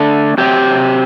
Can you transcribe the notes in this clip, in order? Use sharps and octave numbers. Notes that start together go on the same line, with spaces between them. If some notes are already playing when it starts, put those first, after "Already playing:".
Already playing: D3 A3 D4 A4
C3 F#3 C4 G4